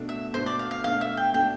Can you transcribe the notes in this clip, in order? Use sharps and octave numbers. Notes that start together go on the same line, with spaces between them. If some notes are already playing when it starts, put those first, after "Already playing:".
Already playing: B2 A3 D4
E5
B2 A3 D4 C5
D5
F5
F5
B2 A3 D4 F5
E5
G5
B2 A3 D4 G5